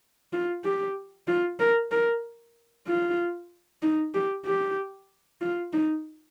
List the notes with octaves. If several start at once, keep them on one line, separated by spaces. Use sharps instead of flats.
F4
G4
F4
A#4
A#4
F4
D#4
G4
G4
F4
D#4